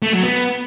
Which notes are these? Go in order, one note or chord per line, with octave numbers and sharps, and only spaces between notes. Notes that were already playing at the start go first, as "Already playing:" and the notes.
A3
F#3
B3